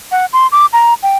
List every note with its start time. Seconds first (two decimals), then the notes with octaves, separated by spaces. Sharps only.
0.11 F#5
0.33 C6
0.52 D6
0.73 A#5
1.03 G5